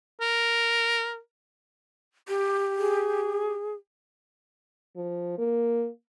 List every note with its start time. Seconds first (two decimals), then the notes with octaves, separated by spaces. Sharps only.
0.21 A#4
2.28 G4
2.78 G#4
4.96 F3
5.38 A#3